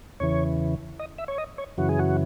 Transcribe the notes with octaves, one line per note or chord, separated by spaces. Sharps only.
E2 C#3 E3 C#5
D#5
E5
C#5
D#5
C#5
F#2 C#3 E3 F#4
G#4
F#4